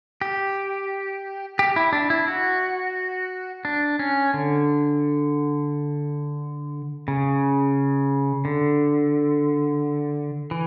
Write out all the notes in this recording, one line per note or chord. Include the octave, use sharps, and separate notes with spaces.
G4
G4
E4
D4
E4
F#4
D4
C#4
D3
C#3
D3
E3